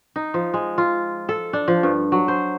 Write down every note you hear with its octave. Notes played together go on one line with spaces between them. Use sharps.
D#4
F3
G#3
F4
A4
D4
F3
G2
F#3
C5